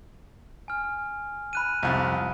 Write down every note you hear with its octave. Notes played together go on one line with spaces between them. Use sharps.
G#5 F6
B5 F#6 D#7
C2 F2